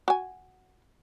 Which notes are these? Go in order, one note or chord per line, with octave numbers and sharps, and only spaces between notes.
F#4 G#5